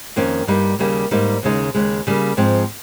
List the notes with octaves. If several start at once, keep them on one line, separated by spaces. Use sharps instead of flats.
F2 D#3 A#3 C#4
G2 G3 A#3 D#4
D#2 C#3 G3 A#3
G#2 G3 A#3 D#4
D#2 C#3 G#3 D#4
D#2 C#3 G#3
C#3 G3 A#3
G#2 F3 G#3 C4